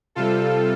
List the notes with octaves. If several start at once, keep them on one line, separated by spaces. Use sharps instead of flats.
C3 G3 F4 A4